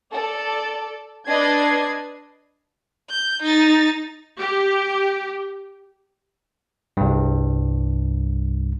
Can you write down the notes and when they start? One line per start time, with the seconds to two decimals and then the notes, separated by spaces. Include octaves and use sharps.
0.11 A4 D5
1.27 D4 B4 D5 D#5 G#6 C7
3.10 G6
3.42 D#4 A6
4.38 G4
6.97 C2 G2